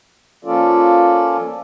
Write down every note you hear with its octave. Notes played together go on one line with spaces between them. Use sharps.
F3 A#3 C#4 F4 A4 D5